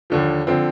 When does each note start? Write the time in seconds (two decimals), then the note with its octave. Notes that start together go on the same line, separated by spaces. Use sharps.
0.10 D#2 D3 F3
0.47 D3 F3 C4